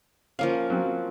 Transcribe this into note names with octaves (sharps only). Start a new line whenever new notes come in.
F3 A#3 C#4 F5
F#3 C4